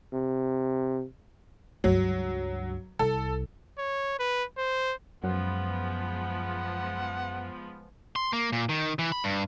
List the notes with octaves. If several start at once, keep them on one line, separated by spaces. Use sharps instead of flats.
C3
C#2 G2 F#3
C2 A4
C#5
B4
C5
F#2 F3 G#3 B3 F#5
C6
A#3
A#2
D#3
E3
B5
G2